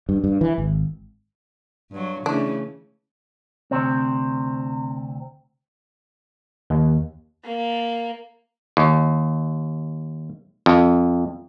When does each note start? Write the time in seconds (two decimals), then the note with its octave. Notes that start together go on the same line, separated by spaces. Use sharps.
0.09 G2
0.24 G2
0.41 E3
0.58 G#1
1.91 G2 F#3
2.26 C#3 E3 A3 D4
3.71 D2 C3 C4
6.70 D#2
7.45 A#3
8.77 D#2
10.66 F2